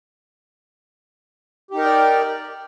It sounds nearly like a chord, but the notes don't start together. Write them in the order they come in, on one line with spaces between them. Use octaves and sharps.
G4 D#4 A#4 G5 D5